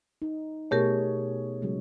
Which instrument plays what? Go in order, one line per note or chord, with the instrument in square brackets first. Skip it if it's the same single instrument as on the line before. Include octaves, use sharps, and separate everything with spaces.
[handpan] D#4
[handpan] B2 G#4 C#5 [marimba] A3 G4 A#4
[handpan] C#3 F#3 G#3